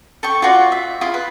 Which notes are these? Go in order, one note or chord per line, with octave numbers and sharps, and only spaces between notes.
A4 G5 C#6
F4 F#4 D5
E5
E4 F4 G#4
B4